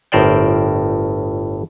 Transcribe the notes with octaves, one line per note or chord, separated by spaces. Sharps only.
G1 A2 A#4 C5 D5 G5